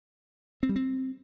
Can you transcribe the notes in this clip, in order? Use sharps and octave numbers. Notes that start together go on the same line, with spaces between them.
C4
G3
C4